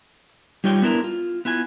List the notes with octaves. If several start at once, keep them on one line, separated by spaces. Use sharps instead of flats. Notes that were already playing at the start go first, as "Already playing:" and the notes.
G3 D#4 F4 C#5 G5
B3 D4 E4 A#4
F4
B3 E4 F4 G#5